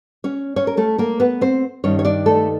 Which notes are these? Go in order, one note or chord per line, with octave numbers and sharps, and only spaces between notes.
C#4 C#5
C#4 C#5
A#4
A3 A4
A#3 A#4
B3 B4
C4 C5
G2 D#3 C#4 C#5
C#5
D4 D5
A3 A4